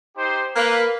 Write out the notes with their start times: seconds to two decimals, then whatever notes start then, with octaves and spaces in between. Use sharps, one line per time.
0.17 D#4 G4 C5
0.56 A#3 B4